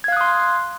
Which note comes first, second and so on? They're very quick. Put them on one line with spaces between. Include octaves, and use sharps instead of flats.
G#6 F5 F#6 D#6 C6